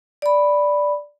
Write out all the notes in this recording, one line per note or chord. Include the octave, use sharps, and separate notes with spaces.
D5 B5